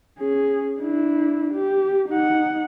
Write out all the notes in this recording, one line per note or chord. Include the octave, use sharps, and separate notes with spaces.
C#4 G#4
D4 E4
G4
D#4 F#5